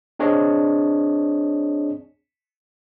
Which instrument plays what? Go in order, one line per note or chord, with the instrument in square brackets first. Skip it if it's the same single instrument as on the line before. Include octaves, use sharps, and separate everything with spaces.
[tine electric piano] C4 D4 G#4 C#5 D#5